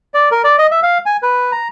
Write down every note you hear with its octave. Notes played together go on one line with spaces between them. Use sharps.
D5
A#4
D5
D#5
E5
F5
G#5
B4
A#5